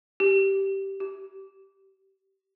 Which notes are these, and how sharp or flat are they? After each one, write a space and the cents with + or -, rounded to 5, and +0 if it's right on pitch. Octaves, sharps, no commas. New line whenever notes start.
G4 -10
G4 -30